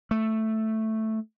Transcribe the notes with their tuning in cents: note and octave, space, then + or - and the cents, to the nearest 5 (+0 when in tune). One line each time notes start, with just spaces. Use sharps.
A3 +0